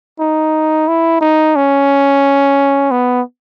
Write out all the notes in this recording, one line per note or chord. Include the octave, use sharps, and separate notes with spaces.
D#4
E4
D#4
C#4
B3